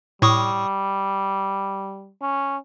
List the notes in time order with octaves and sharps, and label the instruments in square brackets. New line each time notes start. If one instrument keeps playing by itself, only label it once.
[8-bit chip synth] A2 C#6 D#6 [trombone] G3
[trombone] C#4